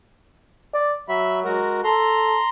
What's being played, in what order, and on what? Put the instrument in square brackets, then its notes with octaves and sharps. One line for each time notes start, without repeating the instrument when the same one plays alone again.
[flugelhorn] D5
[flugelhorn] F#3 [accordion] E5 B5
[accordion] G#3 F#4 A#4
[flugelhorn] A4 [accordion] A#5 C6